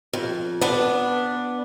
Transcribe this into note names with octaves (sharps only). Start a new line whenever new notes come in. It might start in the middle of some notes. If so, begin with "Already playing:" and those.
F2
B3 D4